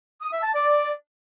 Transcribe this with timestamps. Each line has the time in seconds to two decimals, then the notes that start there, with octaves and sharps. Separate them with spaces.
0.21 D#6
0.32 E5
0.43 A5
0.54 D5